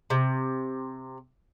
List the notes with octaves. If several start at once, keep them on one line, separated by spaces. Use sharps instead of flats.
C3